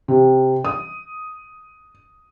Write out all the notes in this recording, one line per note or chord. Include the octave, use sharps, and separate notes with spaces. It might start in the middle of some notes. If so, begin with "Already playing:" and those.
C3
D#6